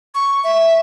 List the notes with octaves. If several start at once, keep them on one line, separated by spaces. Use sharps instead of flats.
C#6
E5